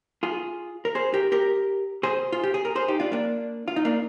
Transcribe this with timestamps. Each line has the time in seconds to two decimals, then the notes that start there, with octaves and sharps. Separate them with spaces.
0.23 F4 G#4
0.85 A#4
0.95 G#4 C5
1.14 G4 A#4
1.32 G4 A#4
2.03 G#4 C5
2.32 F4
2.43 G4
2.54 G#4
2.65 A#4
2.75 G#4 C5
2.88 D#4 G4
3.00 D4 F4
3.12 A#3 D4
3.68 F4
3.76 D#4
3.85 A#3 D4